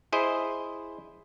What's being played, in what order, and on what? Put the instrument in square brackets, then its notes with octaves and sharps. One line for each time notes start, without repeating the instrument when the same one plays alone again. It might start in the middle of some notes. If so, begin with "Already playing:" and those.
[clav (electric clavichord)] E4 G#4 C5 D#5